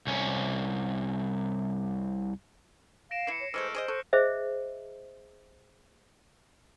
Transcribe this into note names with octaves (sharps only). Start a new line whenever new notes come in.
C2 C#4
F5 A#6 D7 E7
E3 E4 C7 C#7
C#5
E3 G#3 A3 C5 E6 F6 C#7
G#4 C5 C#5 D#5
A4 C#6 F#6
G#4 C5 D#5 E5